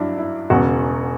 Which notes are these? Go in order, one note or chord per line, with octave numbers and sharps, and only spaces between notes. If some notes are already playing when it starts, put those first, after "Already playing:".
Already playing: G2 F#3 D4 E4
E4
E1 E2 C#3 F#4